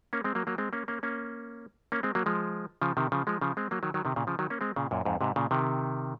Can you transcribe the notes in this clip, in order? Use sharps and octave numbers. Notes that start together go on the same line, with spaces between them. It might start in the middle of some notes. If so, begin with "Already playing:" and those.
A#3 C#4
G#3 C4
F#3 A#3
F#3 A#3
G#3 C4
A#3 C#4
A#3 C#4
A#3 C#4
A#3 C#4
G#3 C4
F#3 A#3
F3 G#3
C#3 F3
C3 D#3
C#3 F3
F3 G#3
C#3 F3
G#3 C4
F#3 A#3
D#3 F#3
D#3 F#3
C3 D#3
A#2 C#3
C#3 F3
D#3 F#3
A#3 C#4
G#3 C4
A#2 C#3
F#2 A#2
F2 G#2
G#2 C3
A#2 C#3
C3 D#3